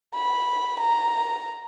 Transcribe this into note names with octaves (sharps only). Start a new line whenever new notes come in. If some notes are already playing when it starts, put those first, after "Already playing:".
B5
A#5